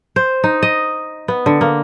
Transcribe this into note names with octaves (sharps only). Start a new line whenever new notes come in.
C5
D#4
D#5
B3
D3
A#3